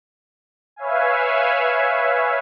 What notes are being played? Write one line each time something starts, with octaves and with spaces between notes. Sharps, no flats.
B4 C#5 E5 F5 G#5